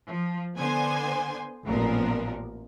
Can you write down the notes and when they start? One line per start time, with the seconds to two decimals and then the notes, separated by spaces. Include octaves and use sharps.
0.10 F3
0.57 D3 B3 C5 G#5 C6
1.67 A1 A#2 F3 B3 A#4